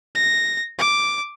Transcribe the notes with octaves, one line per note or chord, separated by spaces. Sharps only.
A#6
D6